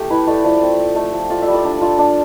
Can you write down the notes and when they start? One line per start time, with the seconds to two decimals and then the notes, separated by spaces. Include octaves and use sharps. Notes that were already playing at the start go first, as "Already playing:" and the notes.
Already playing: A3 G4
0.10 E4 B4
0.27 A3 D5
0.44 F3 D5
0.62 C4
0.79 C4
0.96 A3
1.13 F3
1.30 F4 D5
1.42 E5
1.47 G3
1.54 D5
1.64 D4
1.81 F4
1.98 D4